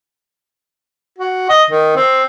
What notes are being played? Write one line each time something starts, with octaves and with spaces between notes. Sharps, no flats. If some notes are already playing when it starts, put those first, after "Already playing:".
F#4
D#5
D#3
C4